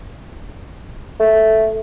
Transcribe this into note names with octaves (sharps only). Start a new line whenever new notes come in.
A3